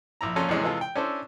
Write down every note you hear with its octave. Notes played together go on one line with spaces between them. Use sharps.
A#1 E4 A#5
F2 A#2 C#4 F4 A4 A#5
E2 A2 C3 G#3 C#4
C3 E3 G#3 F4 A4
G5
C#4 D4 E4 A4 C5